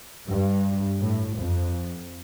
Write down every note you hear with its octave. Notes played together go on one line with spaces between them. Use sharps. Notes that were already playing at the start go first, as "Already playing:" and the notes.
G2
A2
F2